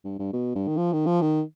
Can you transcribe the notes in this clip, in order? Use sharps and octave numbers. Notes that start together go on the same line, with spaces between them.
G2
G2
B2
G2
D#3
F3
D#3
F3
D#3